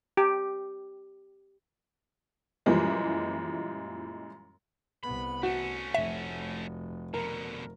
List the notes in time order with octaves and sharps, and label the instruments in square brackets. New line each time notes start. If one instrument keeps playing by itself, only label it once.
[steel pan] G4
[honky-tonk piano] F#2 A#2 E3 F3 G3 G#3
[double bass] C2 B3 [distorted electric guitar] B5
[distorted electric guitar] A3 C#4 [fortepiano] F#4
[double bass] F1 [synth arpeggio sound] E5
[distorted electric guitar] B2 D3 [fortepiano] A#4